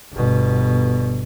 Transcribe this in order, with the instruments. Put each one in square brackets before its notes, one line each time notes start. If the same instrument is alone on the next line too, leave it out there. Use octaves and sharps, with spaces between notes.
[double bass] G1 B2